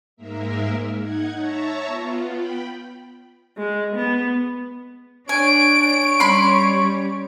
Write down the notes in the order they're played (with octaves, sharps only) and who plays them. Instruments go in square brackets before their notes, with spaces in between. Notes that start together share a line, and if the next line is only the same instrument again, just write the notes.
[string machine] G#2 G#3 A#3 A#4 E5
D#4 F#5 G#6
C#5 E5 A5 A#5 C#6
B3 F4
G5 B5
[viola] G#3
B3
[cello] D4 [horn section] C#5 [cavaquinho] G#5 [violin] D7
[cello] G3 C#4 [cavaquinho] B5 C6